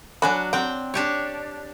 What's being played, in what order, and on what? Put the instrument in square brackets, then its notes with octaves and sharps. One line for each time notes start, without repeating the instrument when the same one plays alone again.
[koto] F#3 D4 F#4 [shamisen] G#5 B5
[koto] C4 G5 [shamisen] F#5
[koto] D4 G4 C#5